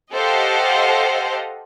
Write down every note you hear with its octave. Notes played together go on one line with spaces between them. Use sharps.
G4 A4 C5 D#5 F5 F#5